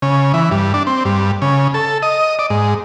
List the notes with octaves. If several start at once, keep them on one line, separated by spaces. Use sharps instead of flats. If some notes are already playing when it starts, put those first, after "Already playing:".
C#3
E3
G2
D4
C4
G2
C#3
A4
D#5
D5
G#2